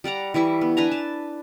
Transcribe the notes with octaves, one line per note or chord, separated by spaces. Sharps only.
G3 D5 F#5 A#5
E3 G3 E4 C#6
B3
D4 B4 G#5 A#5
A5